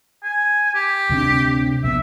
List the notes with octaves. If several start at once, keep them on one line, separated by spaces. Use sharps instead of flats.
G#5
G4
D2 C3 D4
A#1 E3 B3 E5